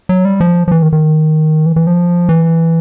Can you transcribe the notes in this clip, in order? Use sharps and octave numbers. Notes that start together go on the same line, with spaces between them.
F#3
G3
F3
F3
E3
D#3
D#3
E3
E3
F3
E3